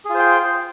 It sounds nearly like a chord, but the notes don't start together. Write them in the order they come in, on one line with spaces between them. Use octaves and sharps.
G#4 F4 C5 G5